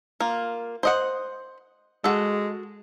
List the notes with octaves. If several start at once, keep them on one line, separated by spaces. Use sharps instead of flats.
A#3 F4
C5 D#5 F#5
G#3 F#4 A4